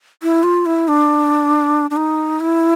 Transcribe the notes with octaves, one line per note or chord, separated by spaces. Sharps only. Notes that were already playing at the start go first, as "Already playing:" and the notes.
E4
F4
E4
D4
D4
D#4
E4